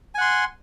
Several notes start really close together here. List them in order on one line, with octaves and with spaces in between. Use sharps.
G#5 F#5 C6